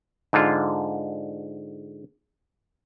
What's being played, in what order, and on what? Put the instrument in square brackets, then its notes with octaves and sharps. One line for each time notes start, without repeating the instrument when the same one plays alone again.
[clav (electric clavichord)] G#2 D3 F4